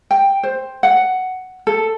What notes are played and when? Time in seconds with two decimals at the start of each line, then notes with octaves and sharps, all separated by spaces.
0.11 G5
0.43 C5
0.83 F#5
1.67 A4